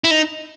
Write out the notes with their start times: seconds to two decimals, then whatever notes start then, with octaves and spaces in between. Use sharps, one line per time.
0.04 E4
0.11 D#4